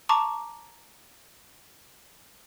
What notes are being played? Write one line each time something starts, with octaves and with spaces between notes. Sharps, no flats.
A5 A#5 C#6 D6